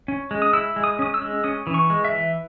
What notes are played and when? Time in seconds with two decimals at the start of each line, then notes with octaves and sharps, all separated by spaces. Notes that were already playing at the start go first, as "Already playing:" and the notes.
0.08 C#4
0.31 G#3
0.42 D#6
0.53 E4 E6
0.76 G#3
0.84 D#6
0.99 C#4 D#6
1.14 E6
1.21 G#3
1.44 C#4 D#6
1.67 E3
1.74 C#6
1.90 G#3
2.05 E5
2.12 E3